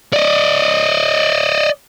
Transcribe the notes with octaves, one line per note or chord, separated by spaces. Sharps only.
D5 D#5